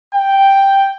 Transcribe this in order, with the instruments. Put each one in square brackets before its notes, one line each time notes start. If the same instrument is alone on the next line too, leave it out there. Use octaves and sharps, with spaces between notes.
[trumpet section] G5